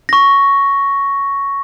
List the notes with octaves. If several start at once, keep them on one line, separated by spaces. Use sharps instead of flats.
C#6 A#6